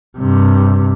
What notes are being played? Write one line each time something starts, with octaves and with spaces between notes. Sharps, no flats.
G2 C3